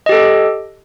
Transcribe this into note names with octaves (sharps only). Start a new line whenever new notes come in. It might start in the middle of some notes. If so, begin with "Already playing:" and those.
G4 A4 D#5